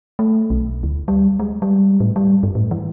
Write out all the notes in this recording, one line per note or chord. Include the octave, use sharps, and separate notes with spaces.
A3
B1
D2
G3
G#3
G3
A2
G3
G2
A2
E3